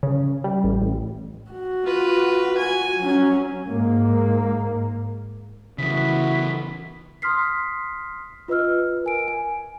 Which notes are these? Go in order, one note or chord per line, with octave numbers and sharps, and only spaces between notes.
C#3
G3
A1
A1
F#4
F4 B4
G#5
F#3 C#4
G#2 A#3
C#3 E3 B3 E4 F#4 B6
C6 D#6 F6 B6 C7
F4 B4 D#5 E6 F6
A#4 G#5 D7
G#5